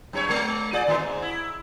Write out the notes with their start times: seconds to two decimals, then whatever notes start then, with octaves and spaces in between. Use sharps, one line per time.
0.13 F#2 D#4 C#5
0.30 G#3
0.73 F4 G#4 D5
0.87 A2 D#3
0.99 G#2
1.22 E4